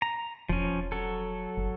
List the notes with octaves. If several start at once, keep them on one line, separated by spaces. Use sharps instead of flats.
A#5
E1 F3 C#4
F#3 A4
F#1